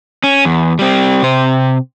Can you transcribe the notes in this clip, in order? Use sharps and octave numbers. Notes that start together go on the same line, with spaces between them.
C#4
E2
G3 C4
C3 C5